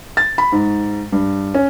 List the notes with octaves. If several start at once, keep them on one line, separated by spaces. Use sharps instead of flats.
A6
B5
G#2
G2
C#4